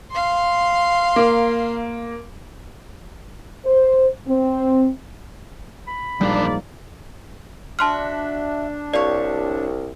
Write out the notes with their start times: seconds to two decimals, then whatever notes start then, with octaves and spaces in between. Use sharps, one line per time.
0.11 F5 C6
1.16 A#3
3.66 C5
4.28 C4
5.87 B5
6.21 A#1 E2 G#2 G3 A#3 D4 D5
7.79 D4 F#4 E5 F#5 A5 C6 F6
8.94 C2 F4 G4 C#5 D5